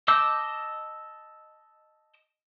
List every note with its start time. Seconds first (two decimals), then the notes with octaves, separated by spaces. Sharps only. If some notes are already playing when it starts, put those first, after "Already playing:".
0.08 D#5 A5 D6 E6 G6